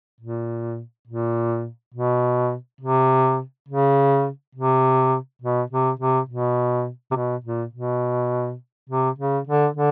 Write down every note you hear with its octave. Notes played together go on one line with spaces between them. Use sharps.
A#2
A#2
B2
C3
C#3
C3
B2
C3
C3
B2
C3
B2
A#2
B2
C3
C#3
D3
D3